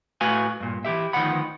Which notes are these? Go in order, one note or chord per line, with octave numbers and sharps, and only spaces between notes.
A2 A3 F#4 B4 F5 G#5
G2 A#2
E3 E4 G4 E5
D2 D#3 F3 B3 F#5 B5